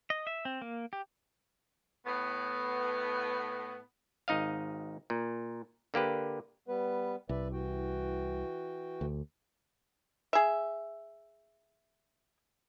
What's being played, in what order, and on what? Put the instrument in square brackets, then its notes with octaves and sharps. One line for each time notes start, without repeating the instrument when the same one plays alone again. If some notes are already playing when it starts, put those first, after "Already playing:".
[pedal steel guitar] D#5
E5
C4
A#3
G4
[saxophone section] A2 B3
[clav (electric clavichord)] G#1 D#4 D#5 F5
A#2
D3 A#3 G4 B4
[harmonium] G3 B3 B4
[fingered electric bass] C2 [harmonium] B4 D5 E5
[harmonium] E3 F#4 G5
[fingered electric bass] D2
[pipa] G#4 E5